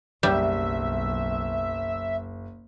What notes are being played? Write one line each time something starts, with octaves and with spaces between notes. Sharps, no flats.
F#1 B1 G3 E5